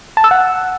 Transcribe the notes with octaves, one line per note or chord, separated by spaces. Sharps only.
A5
E6
F#5